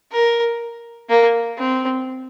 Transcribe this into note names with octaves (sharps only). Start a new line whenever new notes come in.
A#4
A#3
C4